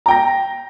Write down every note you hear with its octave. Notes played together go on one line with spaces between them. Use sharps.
G5 A#5 A#6